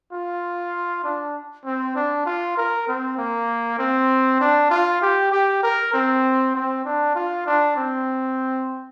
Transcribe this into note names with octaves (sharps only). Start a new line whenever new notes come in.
F4
D4
C4
D4
F4
A#4
C4
A#3
C4
D4
F4
G4
G4
A#4
C4
C4
D4
F4
D4
C4